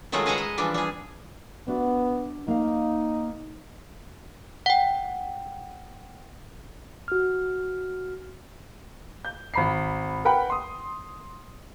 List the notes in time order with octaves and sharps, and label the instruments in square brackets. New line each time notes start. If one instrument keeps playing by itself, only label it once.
[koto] D#3 F#3 G#3 A3 F4
G#4 B4 D#5 E5 F#5 A#5
D#5
E3 F3 G3 D4
G3 G#4
[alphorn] B3 [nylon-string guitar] D4 F#4 E5
[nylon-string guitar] A#3 F5 [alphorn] D#4
[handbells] F#5 G5
[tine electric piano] F#4 F6
[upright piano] G6
G#1 B5 C7
A#4 B4 F#5 G5 B5
C6 D#6